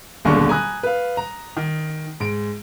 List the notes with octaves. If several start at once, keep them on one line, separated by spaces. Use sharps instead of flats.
D#1 B1 D3 G#3 A#3 C#6
G#5 A#5 B5 D#6 F#6
B4 F5
A#5
D#3
G#2 D7